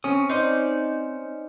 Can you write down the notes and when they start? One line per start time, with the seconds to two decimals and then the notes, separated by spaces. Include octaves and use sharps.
0.04 C4 C#4 D#6
0.29 D#4 C5 D5